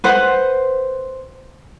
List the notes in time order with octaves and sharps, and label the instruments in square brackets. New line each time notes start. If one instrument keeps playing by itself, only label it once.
[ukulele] B4 C5 F#5